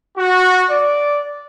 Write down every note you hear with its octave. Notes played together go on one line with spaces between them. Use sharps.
F#4
D5